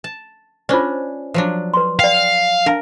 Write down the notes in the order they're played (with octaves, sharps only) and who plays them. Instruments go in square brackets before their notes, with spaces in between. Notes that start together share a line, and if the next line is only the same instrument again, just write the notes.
[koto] A5
[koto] C#4 D4 [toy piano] F4 C5 D5
[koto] F3 F#3 D4
[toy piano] B4 C6
[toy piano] D5 G5 [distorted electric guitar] F5
[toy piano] D4 F5 A5 [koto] A#4